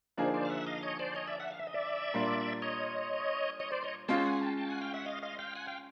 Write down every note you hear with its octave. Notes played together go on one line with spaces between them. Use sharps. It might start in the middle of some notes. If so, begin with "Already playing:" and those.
D3 F3 A#3 D#4 G#4 C5 D5
C5 D5
F5
E5 F#5
D#5 F5
C#5 D#5
C5 D5
C#5 D#5
D5 E5
E5 F#5
F5
E5
D#5
D5 E5
A#2 G3 A#3 D4
C#5 D#5
C#5 D#5
C5 D5
C#5 D#5
G#3 C#4 F4 G5 A5
F#5 G#5
G5 A5
G5 A5
F#5 G#5
F5 G5
E5 F#5
D#5 F5
D#5 F5
F5 G5
F#5 G#5
F5 G5